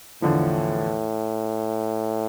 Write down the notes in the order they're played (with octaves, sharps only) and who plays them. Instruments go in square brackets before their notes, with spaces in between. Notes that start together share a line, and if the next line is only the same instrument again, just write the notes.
[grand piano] E2 D3 F3 [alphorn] A2